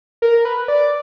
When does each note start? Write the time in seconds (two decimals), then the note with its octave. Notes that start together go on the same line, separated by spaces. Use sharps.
0.22 A#4
0.45 B4
0.68 D5